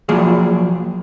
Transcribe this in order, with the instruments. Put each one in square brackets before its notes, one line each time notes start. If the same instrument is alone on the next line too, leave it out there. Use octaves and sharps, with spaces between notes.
[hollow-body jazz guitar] F3 F#3 A#3 G#4